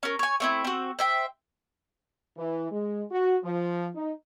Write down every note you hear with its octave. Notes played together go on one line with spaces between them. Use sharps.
C#4 A#4
C#5 G#5
A3 C4 E4
C4 F#4
C5 E5 G5
E3
G#3
F#4
F3
D#4